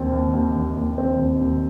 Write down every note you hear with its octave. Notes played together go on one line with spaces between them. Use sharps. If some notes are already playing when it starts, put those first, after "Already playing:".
Already playing: D#2 C4
D#2
D#2
D#2
D#2
C4
D#2
D#2